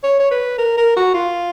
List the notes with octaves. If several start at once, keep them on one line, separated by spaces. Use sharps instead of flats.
C#5
C#5
B4
A#4
A#4
F#4
F4